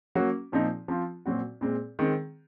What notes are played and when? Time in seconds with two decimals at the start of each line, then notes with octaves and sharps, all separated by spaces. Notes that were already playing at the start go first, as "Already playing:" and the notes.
0.15 F#3 A#3 C#4 F#4
0.52 A#2 F3 C4 D#4
0.88 F3 C4 F4
1.26 A#2 F#3 C4 F#4
1.61 A#2 G#3 C4
1.99 D#3 G#3 C4